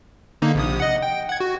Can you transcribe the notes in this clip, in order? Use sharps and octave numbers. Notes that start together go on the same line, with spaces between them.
D3 A#3 D#4
A#1 C3 D#6
D#5 F#5
G5
F#5 G#6
F#4